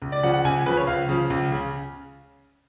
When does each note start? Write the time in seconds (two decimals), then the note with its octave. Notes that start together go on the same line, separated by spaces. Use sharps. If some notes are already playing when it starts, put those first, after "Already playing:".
0.02 C#2
0.12 D5
0.23 C#3 F3 F#5
0.34 F#5
0.44 C#2 G#5
0.66 C#3 F3 B4
0.77 C#5
0.87 C#2 F5
1.09 C#3 F3
1.30 C#2
1.52 C#3